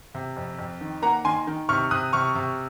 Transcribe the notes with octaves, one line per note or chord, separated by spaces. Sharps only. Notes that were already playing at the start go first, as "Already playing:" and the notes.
C3
F2
F2
D#3
A#3 F#5 A#5
D#3 G#5 C6
D#3
C3 C#6 F6
C3 D#6 F#6
C3 C#6 F6
C3